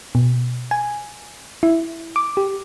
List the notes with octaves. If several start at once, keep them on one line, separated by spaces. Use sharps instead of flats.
B2
G#5
E4
D6
G4